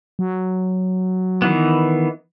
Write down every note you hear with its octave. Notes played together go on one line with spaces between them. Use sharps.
F#3
D#3 E3 B3